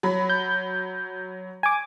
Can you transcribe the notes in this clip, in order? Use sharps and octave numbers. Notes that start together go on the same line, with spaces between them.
F#3 B5
G6
G#5 D6